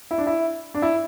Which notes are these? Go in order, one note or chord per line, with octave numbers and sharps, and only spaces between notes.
E4
D4
E4
D4
E4